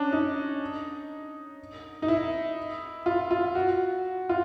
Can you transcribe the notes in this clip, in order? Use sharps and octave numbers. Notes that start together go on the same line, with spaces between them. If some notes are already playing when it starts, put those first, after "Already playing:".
Already playing: C#4 D4
D#4
D#4
E4
F4
F4
F#4
F4